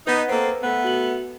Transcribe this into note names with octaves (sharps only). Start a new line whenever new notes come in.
B3 D#4 B4 F#5 F#6
A#3 C4 A4
A3 B3 F#5
F#4 F#7